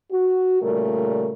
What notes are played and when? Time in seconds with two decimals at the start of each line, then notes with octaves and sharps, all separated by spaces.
0.11 F#4
0.62 A#2 C#3 G3 A3 A#4